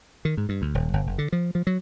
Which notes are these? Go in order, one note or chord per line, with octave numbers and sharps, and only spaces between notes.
D#3
G#2
G2
D2
D#1
G1
F#1
D3
F3
F3
F#3